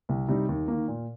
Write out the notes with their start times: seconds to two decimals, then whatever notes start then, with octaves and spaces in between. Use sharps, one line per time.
0.09 C2
0.28 C3 G3 D#4
0.49 D#2
0.68 D#3 A#3
0.88 A#2